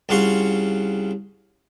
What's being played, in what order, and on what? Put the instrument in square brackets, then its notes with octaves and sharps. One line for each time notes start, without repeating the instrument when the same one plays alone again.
[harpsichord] C2 C#3 F4 F#5 C6 C#6